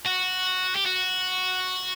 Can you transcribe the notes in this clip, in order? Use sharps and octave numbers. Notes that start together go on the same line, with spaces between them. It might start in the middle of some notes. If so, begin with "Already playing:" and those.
F#4
G4
F#4